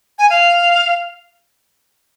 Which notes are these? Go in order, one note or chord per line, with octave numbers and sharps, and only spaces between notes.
G#5
F5